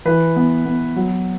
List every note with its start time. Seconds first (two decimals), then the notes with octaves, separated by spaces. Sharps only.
0.05 E3 B4
0.36 B3
0.66 B3
0.96 F#3